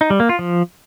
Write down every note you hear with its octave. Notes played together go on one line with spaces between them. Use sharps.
D#4
G3
A#3
F4
F3